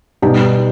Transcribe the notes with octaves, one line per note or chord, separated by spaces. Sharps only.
B2 G3 B3 D#4 G4